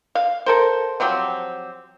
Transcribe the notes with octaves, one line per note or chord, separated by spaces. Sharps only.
F5
A4 A#4 C5
F3 F#3 C4 G4